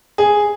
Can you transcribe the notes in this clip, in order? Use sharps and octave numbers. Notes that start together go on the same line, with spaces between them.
G#4